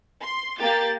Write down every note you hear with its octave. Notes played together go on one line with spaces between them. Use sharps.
C6
A#3 G4 A6